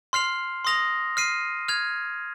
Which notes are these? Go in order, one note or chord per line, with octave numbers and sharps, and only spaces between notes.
C6 F6 C7 F7
C6 D#6 A#6 F7
F6 C7 D#7
F6 G#6 F7